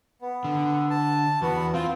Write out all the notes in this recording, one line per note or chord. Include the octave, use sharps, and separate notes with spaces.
B3
D3
A5
E2 B3 F#4
C4 F4